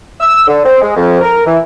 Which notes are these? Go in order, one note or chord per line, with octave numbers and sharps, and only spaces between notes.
E6
D3
C4
G#3
F2
A#4
E3